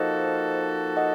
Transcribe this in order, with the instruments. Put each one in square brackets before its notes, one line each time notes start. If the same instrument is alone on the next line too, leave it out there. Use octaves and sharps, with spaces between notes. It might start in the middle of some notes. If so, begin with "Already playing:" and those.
Already playing: [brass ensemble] F3 A#3 D#4 F#4 A4 [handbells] C5 D#5
[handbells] D#5 F#5